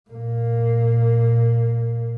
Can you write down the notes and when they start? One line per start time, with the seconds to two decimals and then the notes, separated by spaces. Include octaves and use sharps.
0.11 A#2 A#3